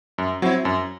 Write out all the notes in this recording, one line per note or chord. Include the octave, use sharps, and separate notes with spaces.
F#2
F#3 C4 E4
F#2